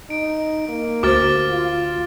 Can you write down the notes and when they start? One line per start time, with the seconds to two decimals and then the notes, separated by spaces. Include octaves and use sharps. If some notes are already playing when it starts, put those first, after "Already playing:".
0.10 D#4 D7
0.68 A#3
1.03 D2 F#4 C5 D6 F6 A6
1.50 F4